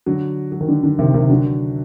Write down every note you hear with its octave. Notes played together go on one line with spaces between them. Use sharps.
D3 F#3
F#3
D#3
D3
D3
C3 D#3
C3 D#3
D3 F#3